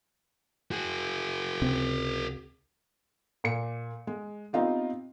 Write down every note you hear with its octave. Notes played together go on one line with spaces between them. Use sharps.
F#4 G#4
C#2 C3 C4
A#2 C#7
G#3
B3 C4 D#4 F4 G4